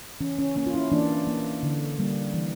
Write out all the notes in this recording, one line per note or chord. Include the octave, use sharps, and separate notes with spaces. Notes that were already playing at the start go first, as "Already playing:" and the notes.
E3 C#4
C#4
A#3 C#4
F4
C#4 E4
E3 A#3 D4
A#3
D3
G3 A#3
E3